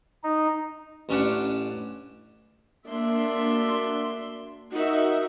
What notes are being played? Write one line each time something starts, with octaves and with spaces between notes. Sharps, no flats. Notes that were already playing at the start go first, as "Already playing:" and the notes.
D#4
A1 C#4 D4 F#5
A#3 D4 F#4 E5 C6
D#4 F#4 A#4 E5